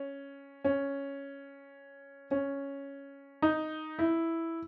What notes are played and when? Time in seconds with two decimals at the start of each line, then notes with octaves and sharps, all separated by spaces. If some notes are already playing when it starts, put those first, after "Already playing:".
Already playing: C#4
0.64 C#4
2.31 C#4
3.42 D#4
3.99 E4